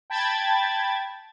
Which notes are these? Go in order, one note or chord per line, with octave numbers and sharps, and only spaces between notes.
G5 A5 B5 G#6 A6